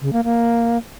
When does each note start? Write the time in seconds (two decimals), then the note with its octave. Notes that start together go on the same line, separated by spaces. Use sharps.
0.02 C#3
0.13 A#3
0.24 A#3